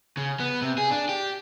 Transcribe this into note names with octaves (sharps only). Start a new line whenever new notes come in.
C#3
B3
C3
G#4
D4
G4